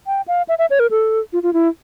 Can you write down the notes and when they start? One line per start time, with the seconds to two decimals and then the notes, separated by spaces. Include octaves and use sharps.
0.07 G5
0.28 F5
0.49 E5
0.59 E5
0.70 C#5
0.80 A#4
0.91 A4
1.33 F4
1.43 F4
1.53 E4